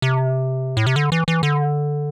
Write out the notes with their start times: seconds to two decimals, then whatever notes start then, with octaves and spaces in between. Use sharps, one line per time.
0.02 C3
0.77 A2
0.87 C3
0.96 D3
1.12 E3
1.28 E3
1.43 D3